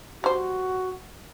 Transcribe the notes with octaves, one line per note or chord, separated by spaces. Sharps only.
G3 F#4 C5